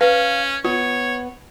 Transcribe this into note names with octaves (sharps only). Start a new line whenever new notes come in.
C#4 B4 F5
B3 F4 C#5